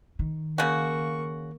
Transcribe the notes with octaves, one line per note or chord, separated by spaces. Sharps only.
D#3
C#3 A#3 F#4 C#6